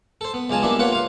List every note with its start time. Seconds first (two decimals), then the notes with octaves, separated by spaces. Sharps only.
0.21 A4 C5
0.34 B3
0.50 C#2 G#3 F4 G#5 A5
0.63 G3 A#3 B3 D4 E4
0.79 A#3 F4 B4 C#5 F#5
0.92 F4 F5